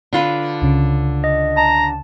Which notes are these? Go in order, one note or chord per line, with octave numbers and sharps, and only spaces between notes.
D3 F4 B4
C#2 C#3
D#5
A5 A#5